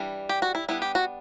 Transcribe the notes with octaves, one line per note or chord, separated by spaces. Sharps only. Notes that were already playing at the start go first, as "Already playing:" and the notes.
Already playing: E3 G3 D4
G4
F#4
E4
G3 B3 D4 E4
G4
F#4